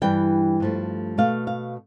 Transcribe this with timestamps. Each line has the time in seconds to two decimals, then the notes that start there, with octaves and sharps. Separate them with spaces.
0.02 G2 E3 G3 G5
0.60 G2 F3 A3
1.18 B2 A3 F5
1.47 F5